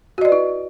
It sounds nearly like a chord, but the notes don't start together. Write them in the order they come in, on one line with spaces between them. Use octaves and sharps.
F#4 D#5 D5 B4 E4